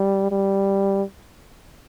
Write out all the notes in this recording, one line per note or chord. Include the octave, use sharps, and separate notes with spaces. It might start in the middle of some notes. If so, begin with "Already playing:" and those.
Already playing: G3
G3